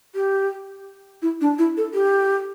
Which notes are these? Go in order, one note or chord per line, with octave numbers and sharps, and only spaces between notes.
G4
E4
D4
E4
A4
G4